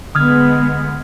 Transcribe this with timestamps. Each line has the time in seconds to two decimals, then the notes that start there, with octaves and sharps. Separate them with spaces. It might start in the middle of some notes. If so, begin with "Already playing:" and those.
0.15 D3 G#3 B3 D#6 F6 G#6